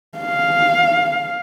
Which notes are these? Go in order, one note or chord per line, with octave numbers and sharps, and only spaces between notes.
F5